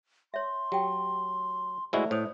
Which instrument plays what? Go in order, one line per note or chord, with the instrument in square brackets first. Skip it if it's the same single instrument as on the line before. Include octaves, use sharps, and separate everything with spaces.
[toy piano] C#5 E5 [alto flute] C6
[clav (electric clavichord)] F#3 [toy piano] G4 G5
[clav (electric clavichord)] G#3 E4 F#4 [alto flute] A3 [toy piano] C5 D5
[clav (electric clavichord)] A2 [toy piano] C5 C#5 D#6